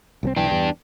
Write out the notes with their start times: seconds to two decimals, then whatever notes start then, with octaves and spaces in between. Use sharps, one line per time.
0.23 C2 F3 C4
0.37 B1 E3 D4 G5
0.51 E2 G2